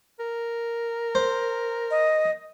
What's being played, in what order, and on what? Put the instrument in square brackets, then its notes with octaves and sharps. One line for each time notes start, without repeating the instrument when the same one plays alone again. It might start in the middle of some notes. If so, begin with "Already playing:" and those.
[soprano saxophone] A#4
[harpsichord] C5
[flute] D#5